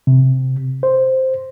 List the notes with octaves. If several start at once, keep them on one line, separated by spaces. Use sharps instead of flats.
C3
C5